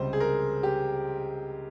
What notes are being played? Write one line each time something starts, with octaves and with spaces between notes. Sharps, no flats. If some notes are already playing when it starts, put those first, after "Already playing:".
Already playing: C#2 C3 G3 C5
G#4
A#4
G4